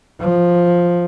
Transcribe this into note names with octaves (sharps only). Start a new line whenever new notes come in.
F3